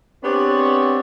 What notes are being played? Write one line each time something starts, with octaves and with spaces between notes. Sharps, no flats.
B3 C4 D4 G4 G#4 C#5